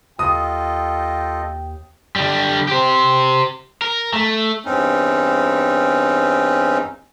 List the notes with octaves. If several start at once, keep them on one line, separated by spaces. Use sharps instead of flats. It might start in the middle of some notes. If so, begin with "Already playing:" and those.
D#2 F4 A4 D#5 G5 D#6
D3 G3
G4 C5
A#4
A3
E2 G2 C4 C#4 D#4